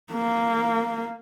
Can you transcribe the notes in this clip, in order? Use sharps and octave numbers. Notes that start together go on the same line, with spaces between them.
A#3